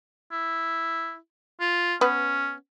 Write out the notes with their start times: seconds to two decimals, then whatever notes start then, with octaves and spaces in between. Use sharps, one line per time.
0.32 E4
1.61 F4
2.01 B3 C#4 B4